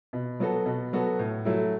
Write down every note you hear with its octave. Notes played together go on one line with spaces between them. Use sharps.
B2
F#3 B3 F#4 A4
B2
F#3 B3 F#4 A4
A2
F#3 A3 E4